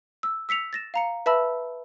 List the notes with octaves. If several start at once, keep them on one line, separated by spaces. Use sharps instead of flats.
E6
E6 B6 C#7 F7
A6 A#6 E7
F5 A#5 C#7
B4 E5 A5 B5 E6 A#6